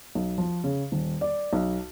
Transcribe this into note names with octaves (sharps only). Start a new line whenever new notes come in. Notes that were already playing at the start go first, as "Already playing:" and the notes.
B1
F3
C#3
D#1
D5
B1